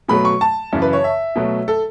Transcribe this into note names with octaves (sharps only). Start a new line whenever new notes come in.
B2 F#3 A3 B5
C#6
A5
F#2 C#3 E3
B4
C#5
E5
B2 F#3 A3
A4